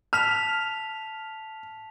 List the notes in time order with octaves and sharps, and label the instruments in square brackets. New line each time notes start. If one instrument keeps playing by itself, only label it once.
[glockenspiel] A5 B6 F7 [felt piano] F6